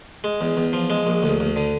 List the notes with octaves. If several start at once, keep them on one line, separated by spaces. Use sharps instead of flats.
G#3
E2
E2
F3
G#3
A#1
D2
D2
D3